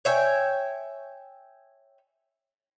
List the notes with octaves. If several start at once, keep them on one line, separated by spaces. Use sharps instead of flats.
C#5 E5 G5 G#5